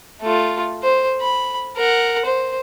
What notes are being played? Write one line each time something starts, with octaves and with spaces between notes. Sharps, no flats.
A3 F4
C5
B5
A#4 F#5
C5